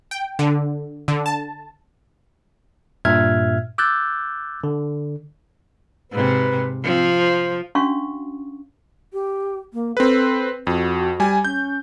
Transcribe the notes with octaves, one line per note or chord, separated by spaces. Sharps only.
G5
D3
D3
A5
G2 A#2 E5 F6 G#6
D6 E6 F#6 G6 A6
D3
G#2 C3 B4
F3 C4
C5
C#4 D4 F#4 F5 F#5 C#6
G4
A#3
C4 A4 B4
F2 F#4
G3 G#5
C#4 G6